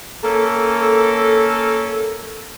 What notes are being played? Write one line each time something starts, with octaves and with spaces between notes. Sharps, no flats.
A#3 C#4 A4